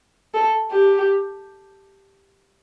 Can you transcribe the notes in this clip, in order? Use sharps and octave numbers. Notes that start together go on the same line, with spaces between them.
A4
G4